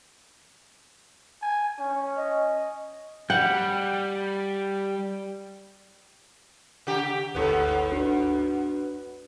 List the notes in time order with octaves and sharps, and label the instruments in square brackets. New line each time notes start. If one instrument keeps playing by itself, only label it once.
[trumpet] G#5
C#4
[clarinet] D#5
[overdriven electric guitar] G3 [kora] F#5 [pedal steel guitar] G5
[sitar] C#3 G4
[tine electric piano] G1 D2 A4 [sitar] G#2 B3
[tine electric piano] D4 F#4 B4